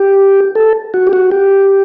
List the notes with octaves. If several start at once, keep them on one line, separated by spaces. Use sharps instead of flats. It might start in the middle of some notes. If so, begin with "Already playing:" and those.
Already playing: G4
A4
F#4
G4
F#4
G4